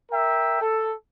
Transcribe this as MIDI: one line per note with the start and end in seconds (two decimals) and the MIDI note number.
0.11 0.60 70
0.11 0.60 76
0.11 0.60 79
0.62 0.93 69